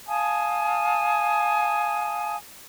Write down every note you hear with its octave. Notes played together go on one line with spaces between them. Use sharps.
F5 G#5 A5 D#6